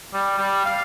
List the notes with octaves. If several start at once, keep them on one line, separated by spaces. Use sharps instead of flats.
G3
G3
F5